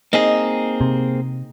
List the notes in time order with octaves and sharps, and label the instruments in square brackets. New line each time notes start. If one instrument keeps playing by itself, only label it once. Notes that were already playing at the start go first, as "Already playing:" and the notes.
[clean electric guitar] A#3 C4 G#4 [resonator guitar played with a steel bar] D#4
[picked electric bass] C3